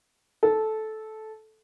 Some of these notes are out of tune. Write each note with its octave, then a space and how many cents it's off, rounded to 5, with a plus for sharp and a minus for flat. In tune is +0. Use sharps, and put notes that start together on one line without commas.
A4 -15